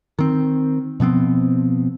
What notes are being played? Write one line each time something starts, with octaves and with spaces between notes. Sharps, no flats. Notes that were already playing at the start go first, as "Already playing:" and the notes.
D#3 C4
B2 F3 B3 C4